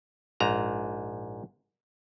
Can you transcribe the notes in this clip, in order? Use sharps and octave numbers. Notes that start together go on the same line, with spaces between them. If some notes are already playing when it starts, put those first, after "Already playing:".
A#1 G#2 A#5